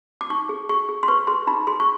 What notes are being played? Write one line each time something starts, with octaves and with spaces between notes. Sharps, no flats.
D6
D#4 C#6
G#4
G#4 C#6
G#4
C6
B4 C#6
G#4 C6
D#4 B5
G#4 C6
C#6